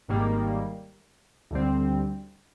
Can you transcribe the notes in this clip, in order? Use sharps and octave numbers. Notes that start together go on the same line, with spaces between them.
G#1 G#2 D#3 G3 A#3
D2 D3 G3 C4